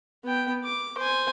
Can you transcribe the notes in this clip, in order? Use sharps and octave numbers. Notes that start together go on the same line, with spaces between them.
B3 G5
D6
C5 G#5